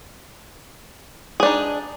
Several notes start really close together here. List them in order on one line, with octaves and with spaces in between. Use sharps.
G#4 D4 D#4